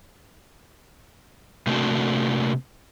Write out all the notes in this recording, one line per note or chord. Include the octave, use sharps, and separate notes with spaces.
C3 A3 A#3 C4 D4 F#4